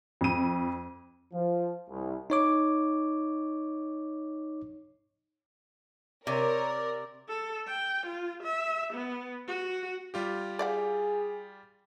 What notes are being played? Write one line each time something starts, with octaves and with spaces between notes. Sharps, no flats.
F2 D#7
F3
C2
D#4 C#5 D6
C3 A#4 C#5 D5
A4
G5
F4
E5
B3
F#4
G3 F4 G4
G#4 D5 F5 F#5